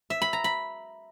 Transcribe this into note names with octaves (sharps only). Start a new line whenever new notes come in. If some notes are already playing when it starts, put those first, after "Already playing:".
E5
B5
A#5
B5